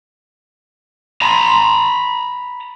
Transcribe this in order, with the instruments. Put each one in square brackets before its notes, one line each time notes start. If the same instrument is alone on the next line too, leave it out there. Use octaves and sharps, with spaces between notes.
[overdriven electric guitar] A#5 B5